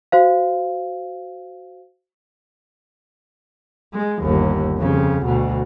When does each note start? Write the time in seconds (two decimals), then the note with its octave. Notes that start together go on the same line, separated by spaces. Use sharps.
0.12 F#4 C5 F5
3.94 G#3
4.23 G1 D#2
4.77 F2 C#3
5.25 D2 B2